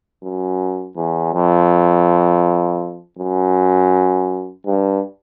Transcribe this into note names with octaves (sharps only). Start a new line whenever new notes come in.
F#2
E2
F2
F#2
G2